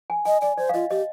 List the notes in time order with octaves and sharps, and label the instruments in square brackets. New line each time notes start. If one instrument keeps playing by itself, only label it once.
[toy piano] G#5
[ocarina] D#5 [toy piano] G#5
[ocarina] D5 [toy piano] G#5
[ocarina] C5 [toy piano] D5
[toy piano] F5
[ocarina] F4 [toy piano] D#5
[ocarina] G4 [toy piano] D#5